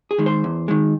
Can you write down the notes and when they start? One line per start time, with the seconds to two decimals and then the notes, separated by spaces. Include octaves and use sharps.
0.11 G#4
0.18 D#3 G#3
0.26 C5
0.44 E2
0.68 D#3 G#3